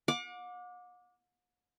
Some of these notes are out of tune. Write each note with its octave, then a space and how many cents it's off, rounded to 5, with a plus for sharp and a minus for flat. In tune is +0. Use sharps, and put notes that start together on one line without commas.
F#5 -45 D6 +0